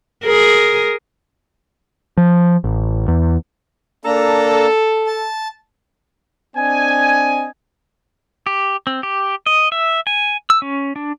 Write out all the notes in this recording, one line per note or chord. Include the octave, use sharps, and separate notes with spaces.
G#4 A#4
F3
A1
E2
A#3 D4 A4 A#5
A5
C4 D4 D#5 G#5
G4
C4
G4
D#5
E5
G#5
E6
C#4
D4